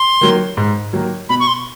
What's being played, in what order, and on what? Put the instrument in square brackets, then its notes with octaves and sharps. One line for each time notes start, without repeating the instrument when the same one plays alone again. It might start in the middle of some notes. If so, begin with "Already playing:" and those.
Already playing: [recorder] C6
[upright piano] D#3 F#3 A#3
G#2
D#3 F#3 A#3
[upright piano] B2 [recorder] B5
[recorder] C#6
C6